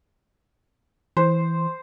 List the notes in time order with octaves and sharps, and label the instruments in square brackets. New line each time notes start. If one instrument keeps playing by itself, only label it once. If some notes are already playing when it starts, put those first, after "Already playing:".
[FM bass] E3 [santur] C5